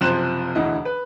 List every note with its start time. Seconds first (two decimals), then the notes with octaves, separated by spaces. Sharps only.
0.01 F#1 C3 F3 C5 F#6 E7
0.55 E1 D2 E3 D#5
0.85 B4